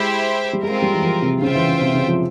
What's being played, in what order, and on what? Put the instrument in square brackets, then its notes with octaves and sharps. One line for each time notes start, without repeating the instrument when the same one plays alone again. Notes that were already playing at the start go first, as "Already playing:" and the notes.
Already playing: [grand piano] G#3 [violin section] E4 G4 C5 E5
[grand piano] G3
[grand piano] G#3 [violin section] C4 F4 A#4
[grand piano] G3
E3
F3
C3
[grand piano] C#3 [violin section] F4 C5 E5 G5
[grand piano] E3
C#3
C3
C#3
F3